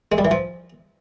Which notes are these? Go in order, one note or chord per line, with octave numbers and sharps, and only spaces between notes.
G#3
G3
E3
F3